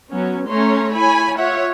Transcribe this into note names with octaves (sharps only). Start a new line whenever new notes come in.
F#3 B3 C#4
A3 C#4 C#5 A#5 C6
E4 C#5 G#5 B5
F4 C#5 E5 F#5